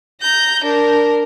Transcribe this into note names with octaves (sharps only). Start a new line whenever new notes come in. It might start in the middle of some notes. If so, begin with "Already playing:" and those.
A#5 G6
D4 A#4